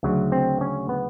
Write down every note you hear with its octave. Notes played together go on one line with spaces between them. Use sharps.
D2 C#3 F#3
C4
C#4
B3